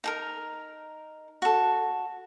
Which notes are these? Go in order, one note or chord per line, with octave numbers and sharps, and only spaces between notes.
D#4 G#4 A#4
F#4 A4